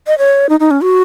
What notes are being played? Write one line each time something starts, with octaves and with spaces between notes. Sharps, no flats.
D#5
C#5
D#4
D#4
C#4
F#4